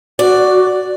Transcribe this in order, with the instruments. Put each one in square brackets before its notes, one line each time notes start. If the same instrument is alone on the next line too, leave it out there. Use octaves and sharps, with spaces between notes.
[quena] F#4 [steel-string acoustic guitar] D5